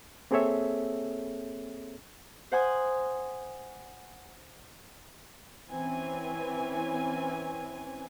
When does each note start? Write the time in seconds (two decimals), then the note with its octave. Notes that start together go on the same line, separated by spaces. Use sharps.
0.31 A#3 C4 G#4 A4 C#5 E5
2.52 C5 F#5 G#5 D#6
5.71 E3 C4 C#4 G#5